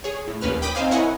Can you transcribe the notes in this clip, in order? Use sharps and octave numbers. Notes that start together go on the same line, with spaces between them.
G#4 C#5
A2
A#1 D#2 C#4 B4 F6
G5 B5 D6 D#6 B6
C4 D#4 C5 F5 G#5
E4 A#4 C#5 D#5 F#5 G#5